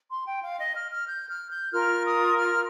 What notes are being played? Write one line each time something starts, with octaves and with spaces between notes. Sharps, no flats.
C6
G5
F5
D#5
F6
F6
G6
F6
G6
F4 A#4 F6
D#6
F6